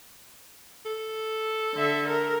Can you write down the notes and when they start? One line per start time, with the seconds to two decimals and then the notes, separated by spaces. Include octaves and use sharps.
0.86 A4
1.75 D3 E5
2.09 A#4